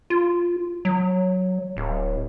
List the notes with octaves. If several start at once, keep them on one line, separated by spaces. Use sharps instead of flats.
F4
F#3
D1